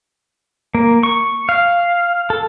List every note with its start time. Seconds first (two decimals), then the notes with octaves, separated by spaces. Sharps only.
0.75 A#3
1.03 C#6
1.49 F5
2.30 A4